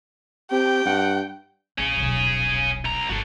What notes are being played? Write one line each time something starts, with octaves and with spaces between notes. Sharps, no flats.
C4 G4 G5
G2 F#5
A#1 A#2 C#4 G#4
D#1 B1
C2 A#5
G1 F#4 A4